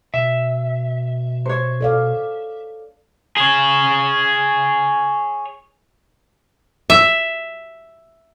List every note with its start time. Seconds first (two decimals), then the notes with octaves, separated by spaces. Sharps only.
0.14 B2 E5
1.46 C5 C#5
1.81 A4 D5 F5
3.37 G#4 C#5
6.90 E5